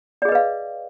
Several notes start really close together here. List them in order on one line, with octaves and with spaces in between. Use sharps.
D5 G#4 D#5 B4 F5